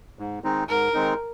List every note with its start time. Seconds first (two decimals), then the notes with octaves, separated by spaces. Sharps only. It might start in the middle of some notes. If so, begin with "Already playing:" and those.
0.19 G#2
0.44 D#3 G#3 C4 D#4
0.69 G#2 A#4
0.94 D#3 G#3 C4 D#4